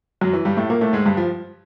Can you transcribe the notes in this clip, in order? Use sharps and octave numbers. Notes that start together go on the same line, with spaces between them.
F#2 F#3
E3
G2 G3
A2 A3
A#2 A#3
A2 A3
G#2 G#3
G2 G3
F3